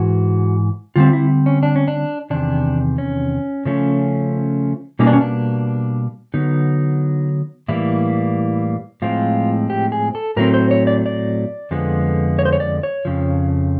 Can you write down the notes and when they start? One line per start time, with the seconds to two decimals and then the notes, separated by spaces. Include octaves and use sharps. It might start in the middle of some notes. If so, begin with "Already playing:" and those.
Already playing: G#2 E3 F#4
0.96 D3 G3 C4 F4
1.13 E4
1.46 C#4
1.63 D4
1.76 C#4
1.88 D4
2.30 E2 C3 D#3 D4
2.98 C#4
3.65 C#3 F3 A3 C#4
4.99 B2 G3 A#3 C#4 D#4
5.07 D4
5.13 C#4
5.21 D4
6.34 D3 F#3 B3 D#4
7.68 A2 E3 G3 A#3 E4
9.02 A2 F3 G#3 C4 F4
9.70 G4
9.92 G#4
10.15 A4
10.37 A2 F#3 A3 C4 A#4
10.54 C5
10.71 C#5
10.87 D5
11.06 D5
11.71 F2 D3 F3 G#3 B3
12.39 C#5
12.45 C5
12.53 C#5
12.60 D5
12.83 C#5
13.05 F2 C#3 F3